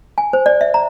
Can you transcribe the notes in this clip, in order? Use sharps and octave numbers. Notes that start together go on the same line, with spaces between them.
G#5
C5
D5
E5
A#5